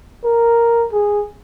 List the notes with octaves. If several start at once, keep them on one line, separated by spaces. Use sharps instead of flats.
A#4
G#4